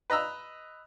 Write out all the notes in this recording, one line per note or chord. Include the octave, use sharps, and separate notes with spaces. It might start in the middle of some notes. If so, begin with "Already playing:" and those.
B4 D#5 A#5 E6